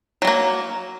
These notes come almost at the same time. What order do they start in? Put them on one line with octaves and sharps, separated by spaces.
F#3 G3 A#3